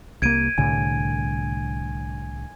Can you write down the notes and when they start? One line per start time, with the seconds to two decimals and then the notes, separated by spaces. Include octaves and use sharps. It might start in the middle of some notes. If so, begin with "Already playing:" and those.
0.22 C2 A#3 G#6 D7 D#7
0.58 C2 A2 D3 G#5